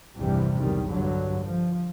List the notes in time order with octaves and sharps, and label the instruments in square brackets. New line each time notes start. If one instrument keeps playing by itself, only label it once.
[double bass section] A#1 E2 G2 C3 E3 G3
B1 E2 D#3 G3
G2 D3 F#3
F3